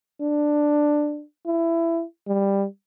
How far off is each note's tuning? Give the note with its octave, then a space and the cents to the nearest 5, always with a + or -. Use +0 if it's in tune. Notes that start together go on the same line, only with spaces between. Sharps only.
D4 +10
E4 +20
G3 +10